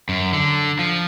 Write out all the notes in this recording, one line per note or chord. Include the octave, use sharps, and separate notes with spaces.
F#2
D3
F3